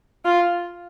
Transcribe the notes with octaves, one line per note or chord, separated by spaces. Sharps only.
F4